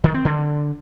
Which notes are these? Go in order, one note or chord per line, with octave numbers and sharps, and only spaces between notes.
D#3
C4
D3